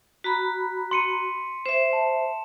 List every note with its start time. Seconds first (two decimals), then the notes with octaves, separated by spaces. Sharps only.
0.24 F#4 A#5 B5 B6
0.91 C6 C#7 D#7
1.66 C5 E5 E7
1.93 A5